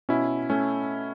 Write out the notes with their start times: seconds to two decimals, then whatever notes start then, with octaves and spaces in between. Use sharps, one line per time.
0.09 B2 C#4 E4
0.50 A3 C#4